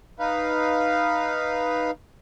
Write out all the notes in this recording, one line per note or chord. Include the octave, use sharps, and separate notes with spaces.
D#4 B4 F5